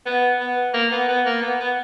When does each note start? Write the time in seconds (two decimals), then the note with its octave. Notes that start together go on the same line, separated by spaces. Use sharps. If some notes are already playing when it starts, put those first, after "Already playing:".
0.06 B3
0.40 B3
0.73 A#3
0.91 B3
1.08 B3
1.25 A#3
1.41 B3
1.59 B3